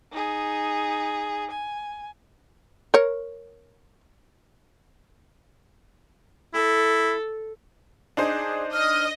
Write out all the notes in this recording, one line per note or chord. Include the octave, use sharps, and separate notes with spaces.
D#4 G#4
G#5
A#4 C#5
E4 A4
D4 D#4 G#4 C5
D#5 F6